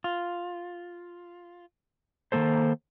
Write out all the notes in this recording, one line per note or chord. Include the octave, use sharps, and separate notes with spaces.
F4
D#3 F#3 A#3 A4 C5